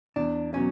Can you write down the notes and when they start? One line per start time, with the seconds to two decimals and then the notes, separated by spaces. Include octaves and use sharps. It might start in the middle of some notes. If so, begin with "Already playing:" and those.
0.16 E2 D4
0.54 B2 F#3 C#4